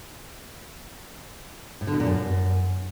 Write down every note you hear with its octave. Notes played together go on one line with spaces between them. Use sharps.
A2
D3
B2
A#2
F#2